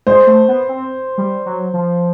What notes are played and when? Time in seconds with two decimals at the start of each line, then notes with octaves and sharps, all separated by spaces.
0.07 G#3 C5
0.27 A3
0.48 B3
0.69 C4
1.18 G3
1.46 F#3
1.74 F3